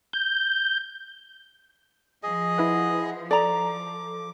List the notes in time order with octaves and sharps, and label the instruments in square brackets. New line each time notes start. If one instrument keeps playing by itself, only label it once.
[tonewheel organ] G6
[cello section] F3 [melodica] G#4 D#5
[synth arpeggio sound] E4 B4 F#5
[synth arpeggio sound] A4 [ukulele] D5 A#5 [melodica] D6